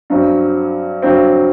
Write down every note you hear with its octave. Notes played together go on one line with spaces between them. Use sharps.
G2 F#3 C4
G2 F#3 C4